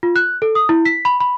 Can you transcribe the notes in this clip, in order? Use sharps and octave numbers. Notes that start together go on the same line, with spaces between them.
F4
F#6
A4
D#6
E4
B6
B5
B5